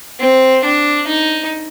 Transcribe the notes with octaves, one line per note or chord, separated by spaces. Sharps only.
C4
D4
D#4